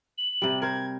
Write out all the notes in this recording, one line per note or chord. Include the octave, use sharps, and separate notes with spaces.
F#7
C3 G3
A#4 C5 G#6